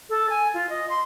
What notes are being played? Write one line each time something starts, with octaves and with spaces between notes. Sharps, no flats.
A4
G#5
F4
D#5
C6